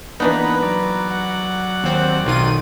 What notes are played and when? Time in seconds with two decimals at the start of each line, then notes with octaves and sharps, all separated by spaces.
0.20 E3 A#3 B3 D4 D#4 B4 F#5 A#5
0.63 F#3 D5
1.10 F#5
1.84 D#2 C4
2.26 B1 D#3 F4 D#7